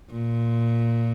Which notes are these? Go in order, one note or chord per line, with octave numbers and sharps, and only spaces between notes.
A#2